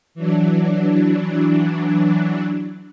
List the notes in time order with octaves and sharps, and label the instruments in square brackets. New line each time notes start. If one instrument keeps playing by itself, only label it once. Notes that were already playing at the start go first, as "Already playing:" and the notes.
[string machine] E3 F#3 D4